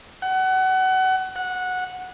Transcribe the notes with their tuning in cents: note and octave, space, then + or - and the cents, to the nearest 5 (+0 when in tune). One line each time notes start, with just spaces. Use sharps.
F#5 +25
F#5 -15